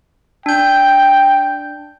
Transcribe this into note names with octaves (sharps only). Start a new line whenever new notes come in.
D4 G5 G6